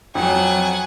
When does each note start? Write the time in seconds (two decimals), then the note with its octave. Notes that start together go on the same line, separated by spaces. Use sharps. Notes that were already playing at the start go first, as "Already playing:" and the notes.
0.15 F2 F#3 F#5 G#5